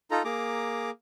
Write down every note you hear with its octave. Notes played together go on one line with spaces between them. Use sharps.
D#4 F4 A4 A#5
A#3 G#4 A#5 D6